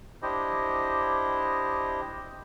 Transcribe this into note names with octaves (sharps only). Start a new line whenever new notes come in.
D4 E4 G4 C5 D#5